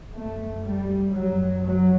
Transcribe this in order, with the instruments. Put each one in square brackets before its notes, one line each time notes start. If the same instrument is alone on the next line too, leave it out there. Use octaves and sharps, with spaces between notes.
[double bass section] F#2 A3
G3
F#2 F#3
F#3